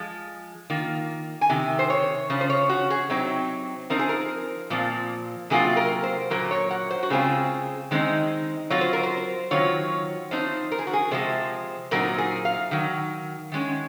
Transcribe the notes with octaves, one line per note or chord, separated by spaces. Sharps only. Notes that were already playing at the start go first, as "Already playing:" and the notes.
Already playing: F3 G#3
D#3 A#3 F4
G#5
C3 D#3
C5
C#5
C#3 F3
C5
C#5
F#4
G#4
C3 F#3 C4 D#4
F3 C4 D#4 A#4
G#4
A#4
A#2 F3 C4
C3 F#3 A#3 F4 G#4
A#4
C5
A#2 F#3 A#3 A#4
C#5
F#5
C5
F#4
C#3 G#3 C4 F4 G#4
D#3 G#3 C4 D#4
F#3 C4 F4 C#5
C5
A#4
C5
D#3 F#3 C4 F4 C#5
F3 C4 D#4 C5
A#4
G#4
F#4
G#4
C3 F3 G#3 C5
A#2 F#3 C4 D#4 A#4
G#4
F5
D#3 F#3
D#3 G#3 C#4